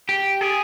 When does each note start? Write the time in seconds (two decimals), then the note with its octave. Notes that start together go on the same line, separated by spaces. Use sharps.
0.09 G4
0.41 G#4